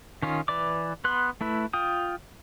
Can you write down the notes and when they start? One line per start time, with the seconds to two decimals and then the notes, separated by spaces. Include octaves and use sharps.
0.22 D#3 C#4 F4
0.48 E3 B4 D5 D6
1.04 B3 B4 C6 F#6
1.41 A3 E4 B4
1.73 F4 G5 D#6